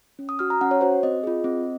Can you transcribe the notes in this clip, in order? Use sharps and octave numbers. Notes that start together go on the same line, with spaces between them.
C#4
D#6
F#4 F6
A#5
C#4 F#5
C#5
F#4 C5
C4 D#5
F4 G#4
C4